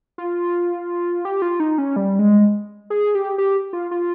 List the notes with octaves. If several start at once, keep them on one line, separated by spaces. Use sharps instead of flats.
F4
G4
F4
D#4
C#4
G3
G#3
G#4
G4
G4
F4
F4